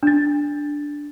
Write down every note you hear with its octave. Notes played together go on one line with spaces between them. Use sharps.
D4 A6